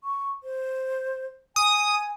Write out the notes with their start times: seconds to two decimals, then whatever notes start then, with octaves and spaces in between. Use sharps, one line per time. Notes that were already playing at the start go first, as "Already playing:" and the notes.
0.04 C#6
0.43 C5
1.56 G#5 D#6